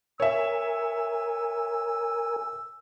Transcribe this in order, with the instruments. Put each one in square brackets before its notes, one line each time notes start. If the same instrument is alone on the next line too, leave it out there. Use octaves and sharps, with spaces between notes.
[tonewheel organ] A#4 G#5 [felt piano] C#5 E5 [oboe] E6